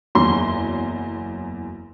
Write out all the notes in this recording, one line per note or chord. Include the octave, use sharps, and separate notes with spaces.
F#1 E2 F#3 C6